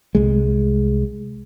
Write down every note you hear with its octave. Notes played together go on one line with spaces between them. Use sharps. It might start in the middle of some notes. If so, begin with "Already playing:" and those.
C2 G#3